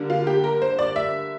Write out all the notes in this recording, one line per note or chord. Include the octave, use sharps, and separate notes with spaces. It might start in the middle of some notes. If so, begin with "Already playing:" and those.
Already playing: D3 G3 A#3
F4
G4
A#4
C5
D5
E5